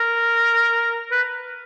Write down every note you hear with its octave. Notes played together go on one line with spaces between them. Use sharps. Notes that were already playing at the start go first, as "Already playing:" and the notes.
Already playing: A#4
B4